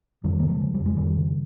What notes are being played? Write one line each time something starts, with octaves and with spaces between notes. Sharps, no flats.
F2 D#3 G3
C#3 A#3
F3 G#3
C#3
G3
F2
G#3
F2 D#3 G3
C#3